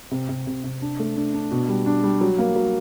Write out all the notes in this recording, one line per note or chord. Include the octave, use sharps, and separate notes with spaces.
C3
C3
C3
C3
D4
A3
D4
D4
B2
G3
D4
G3
F#3
A#3
F#3